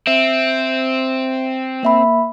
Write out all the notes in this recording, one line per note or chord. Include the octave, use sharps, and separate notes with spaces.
C4 E5
A#3 E5 B5